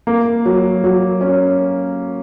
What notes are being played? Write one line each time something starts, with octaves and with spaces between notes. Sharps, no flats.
A#3
F#3
F#3
C#4